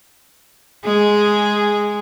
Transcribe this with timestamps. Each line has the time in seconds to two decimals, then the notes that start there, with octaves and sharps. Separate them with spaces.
0.84 G#3 G#4